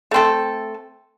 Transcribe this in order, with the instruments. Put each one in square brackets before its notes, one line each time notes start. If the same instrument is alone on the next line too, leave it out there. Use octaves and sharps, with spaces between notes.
[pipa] A3 C4 A4